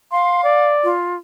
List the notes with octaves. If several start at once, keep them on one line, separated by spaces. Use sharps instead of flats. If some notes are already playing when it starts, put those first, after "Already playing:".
F5 C6
D5
F4